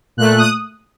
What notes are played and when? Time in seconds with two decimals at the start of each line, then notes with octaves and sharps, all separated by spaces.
0.17 A#2 A3 F#6
0.38 D#6